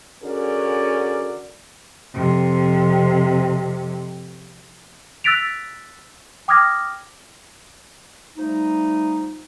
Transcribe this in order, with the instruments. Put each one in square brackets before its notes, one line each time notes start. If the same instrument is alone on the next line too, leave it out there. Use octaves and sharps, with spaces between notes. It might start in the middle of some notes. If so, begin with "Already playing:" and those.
[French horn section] D3 C#4 F#4 G#4 A#4 D5
[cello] F2 C3
[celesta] E6 F#6 A6 B6 D7 F7
G5 D6 D#6 F6 G#6 A#6
[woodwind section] F3 G3 A3 D#4